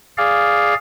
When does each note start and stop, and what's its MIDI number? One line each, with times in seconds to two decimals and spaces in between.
0.18 0.74 68
0.18 0.74 74
0.18 0.74 77